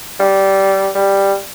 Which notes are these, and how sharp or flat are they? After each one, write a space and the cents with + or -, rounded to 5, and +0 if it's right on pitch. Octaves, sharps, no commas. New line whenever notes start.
G3 -15
G3 +5